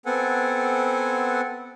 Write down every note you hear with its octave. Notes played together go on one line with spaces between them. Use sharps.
B3 C4 A4 F#5 G#5